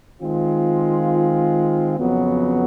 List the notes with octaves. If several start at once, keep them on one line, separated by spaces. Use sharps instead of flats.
D#3 G#3 C4 F4
F2 C#3 F#3 B3